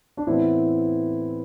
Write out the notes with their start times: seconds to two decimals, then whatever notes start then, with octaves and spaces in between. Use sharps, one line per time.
0.17 D4
0.27 A2 E3 B3 C4 E4